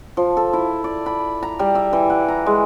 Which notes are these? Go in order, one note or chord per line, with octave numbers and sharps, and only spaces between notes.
F3
A4
E4
D5
B5
A#5
G3
E5
E3
F#5
A#5
G#3